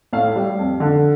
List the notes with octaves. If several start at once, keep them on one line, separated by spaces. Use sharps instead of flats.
A2 F5
G3
F2
D3